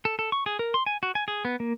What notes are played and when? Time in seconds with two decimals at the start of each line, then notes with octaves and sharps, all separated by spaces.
0.05 A4
0.19 A4
0.32 C#6
0.46 G#4
0.59 A#4
0.74 C6
0.86 G#5
1.03 F#4
1.15 G#5
1.28 G#4
1.45 B3
1.60 A#3